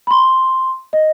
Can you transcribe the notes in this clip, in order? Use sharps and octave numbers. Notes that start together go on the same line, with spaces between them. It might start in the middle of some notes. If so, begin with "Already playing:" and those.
B5
C6
D#5